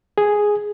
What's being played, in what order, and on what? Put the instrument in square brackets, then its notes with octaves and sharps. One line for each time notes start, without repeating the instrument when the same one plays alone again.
[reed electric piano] G#4